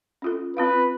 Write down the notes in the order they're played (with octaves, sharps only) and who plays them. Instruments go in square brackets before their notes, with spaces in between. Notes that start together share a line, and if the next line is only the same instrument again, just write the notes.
[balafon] C#4 F4 A4
[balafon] C4 F4 F5 [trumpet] B4